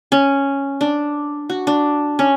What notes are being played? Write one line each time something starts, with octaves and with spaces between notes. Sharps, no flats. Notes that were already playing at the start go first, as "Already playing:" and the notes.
C#4
D4
F#4
D4
C#4